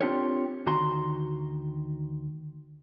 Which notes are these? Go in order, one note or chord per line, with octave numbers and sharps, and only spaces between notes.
C4 D4 F4 G4 A#4 C#5
D2 D#3 F#4 A#5 C6